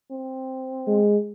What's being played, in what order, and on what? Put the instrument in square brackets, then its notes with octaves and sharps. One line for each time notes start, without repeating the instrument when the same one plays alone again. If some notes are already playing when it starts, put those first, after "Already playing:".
[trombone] C4
[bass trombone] G#3